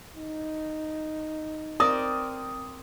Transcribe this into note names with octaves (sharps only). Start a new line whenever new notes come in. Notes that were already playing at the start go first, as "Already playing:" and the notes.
D#4
C4 A#4 D5 D#6